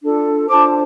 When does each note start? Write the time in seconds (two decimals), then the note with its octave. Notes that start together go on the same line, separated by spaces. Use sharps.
0.03 D4 F4 A4
0.49 D4 F4 C5 A5 D6